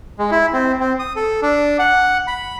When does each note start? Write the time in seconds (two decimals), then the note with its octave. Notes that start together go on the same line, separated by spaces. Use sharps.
0.19 G#3
0.31 E4
0.53 C4
0.81 C4
0.99 D#6
1.16 A4
1.42 D4
1.79 F#5
2.27 B5